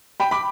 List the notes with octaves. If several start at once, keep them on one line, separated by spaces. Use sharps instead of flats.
G5 B5
B5 D6